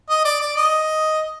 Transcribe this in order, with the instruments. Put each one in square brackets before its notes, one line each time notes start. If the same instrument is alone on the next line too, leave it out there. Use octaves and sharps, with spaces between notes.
[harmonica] D#5
D5
D5
D#5